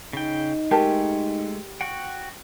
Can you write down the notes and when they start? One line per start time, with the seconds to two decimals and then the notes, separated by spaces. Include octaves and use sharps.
0.13 C#3 D#4 G5
0.71 G#3 A3 G4 A#4 A5
1.81 F#4 F#5 G5